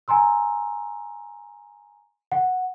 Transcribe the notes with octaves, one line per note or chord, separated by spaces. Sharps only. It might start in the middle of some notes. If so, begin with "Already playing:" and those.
G#5 A#5 C6 E6
F#5